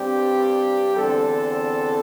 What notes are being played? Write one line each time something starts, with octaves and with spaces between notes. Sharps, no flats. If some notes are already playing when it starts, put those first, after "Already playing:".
Already playing: G2 G3 C4 G4
E2 D3 C4 A4